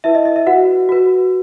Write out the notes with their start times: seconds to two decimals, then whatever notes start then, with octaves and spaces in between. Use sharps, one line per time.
0.04 E4 B4 E5
0.15 D#5
0.25 D#5
0.36 E5
0.46 F#4 B4 F#5
0.89 F#4 B4